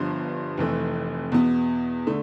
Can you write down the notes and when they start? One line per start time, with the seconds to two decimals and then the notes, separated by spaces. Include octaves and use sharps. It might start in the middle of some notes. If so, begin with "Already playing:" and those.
Already playing: G1 G2 F3 B3 C6
0.58 F1 F2 E3 A3
1.32 E2 B2 B3
2.07 D3 A3